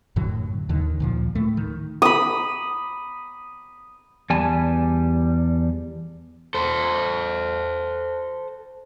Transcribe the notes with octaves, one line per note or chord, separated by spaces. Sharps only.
F#2 A2 D3 F#3
D#2 D3 D#3
D2 A#2 F3
A2 A3
D#3
B5 D#6
E2 G3 G#5 A5
A4 C5